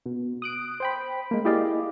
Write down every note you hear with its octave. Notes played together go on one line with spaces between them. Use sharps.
B2
D#6 F#6 D7
C5 G5 B5
G#3 A#3
E4 G4 G#4 D5 D#5 F5